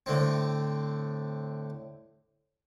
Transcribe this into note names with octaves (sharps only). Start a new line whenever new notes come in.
A2 D3 C4